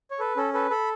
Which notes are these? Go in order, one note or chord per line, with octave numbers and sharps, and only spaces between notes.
C#5
A4 B4
C#4 A4
A4 B4
A4 B5